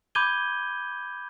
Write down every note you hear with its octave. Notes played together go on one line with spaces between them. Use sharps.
B5 D6 G6 G#6 D#7 G7